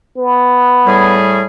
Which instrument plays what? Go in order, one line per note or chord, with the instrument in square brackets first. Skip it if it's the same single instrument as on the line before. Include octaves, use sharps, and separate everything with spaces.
[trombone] B3
[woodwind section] A2 G3 G#4